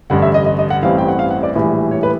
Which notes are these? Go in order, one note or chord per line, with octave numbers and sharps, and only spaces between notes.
A1 G2 D3 F#5
E5
D#5
D#5
D#5
F#5
A1 G2 E3 A3 C4 F5
G5
F#5
F5
F#5
D5
A#1 A2 E3 G3
C#5
B4